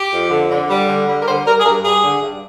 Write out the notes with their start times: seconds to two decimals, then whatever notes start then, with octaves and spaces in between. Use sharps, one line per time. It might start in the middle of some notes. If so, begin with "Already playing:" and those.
Already playing: G4
0.12 F2
0.30 D3
0.49 D3
0.69 G3
0.87 D3
1.07 G3
1.22 A#4
1.26 D3 C5
1.45 G3 A#4
1.60 G#4
1.64 G2 A#4
1.84 G2 G#4
2.03 D3
2.21 G2